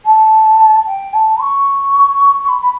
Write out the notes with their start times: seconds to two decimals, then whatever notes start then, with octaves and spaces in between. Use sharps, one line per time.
0.05 A5
0.86 G5
1.14 A5
1.40 C#6
2.44 C#6
2.48 B5
2.61 B5